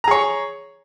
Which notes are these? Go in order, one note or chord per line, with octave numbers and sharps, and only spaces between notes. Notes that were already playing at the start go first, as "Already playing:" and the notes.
G#4 C#5 A#5